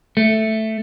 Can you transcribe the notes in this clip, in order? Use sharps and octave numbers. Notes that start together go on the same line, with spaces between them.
A3